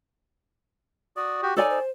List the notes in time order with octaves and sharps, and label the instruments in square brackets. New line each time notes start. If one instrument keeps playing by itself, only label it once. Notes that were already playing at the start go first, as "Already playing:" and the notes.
[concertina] F#4 D5 [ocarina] D#6
[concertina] F#4 G4
[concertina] D#4 [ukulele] A4 D5 G#5 [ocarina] C#5
[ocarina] C5